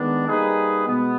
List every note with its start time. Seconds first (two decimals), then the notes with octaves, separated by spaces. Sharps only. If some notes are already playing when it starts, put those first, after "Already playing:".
Already playing: D#3 G#3 B3 D4
0.27 G3 A#3 D#4 G#4 B4
0.87 B2 G#3 B3